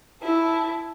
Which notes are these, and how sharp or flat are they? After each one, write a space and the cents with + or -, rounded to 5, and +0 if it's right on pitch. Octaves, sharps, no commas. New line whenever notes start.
E4 +0 A5 -10